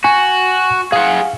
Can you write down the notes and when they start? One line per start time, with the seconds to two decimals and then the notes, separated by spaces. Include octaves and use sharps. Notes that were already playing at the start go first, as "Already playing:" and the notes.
0.04 F#4 G#5
0.92 G#4 F5 F#5